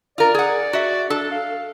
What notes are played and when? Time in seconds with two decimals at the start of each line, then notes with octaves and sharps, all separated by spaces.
0.18 F4 A#4 D5
0.34 G#4 F#5
0.73 F#4 E5
1.10 D4 A4
1.31 F5